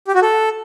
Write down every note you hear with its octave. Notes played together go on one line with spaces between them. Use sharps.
G4
F#4
A4